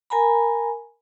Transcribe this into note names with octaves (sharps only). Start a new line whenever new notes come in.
A#4 G#5 A#5 B5